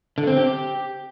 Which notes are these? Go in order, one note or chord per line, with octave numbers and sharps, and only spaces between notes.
D3
C4
G4